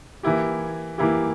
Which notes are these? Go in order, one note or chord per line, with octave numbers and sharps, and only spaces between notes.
E3 A#3 E4 G4
E3 A#3 E4 G4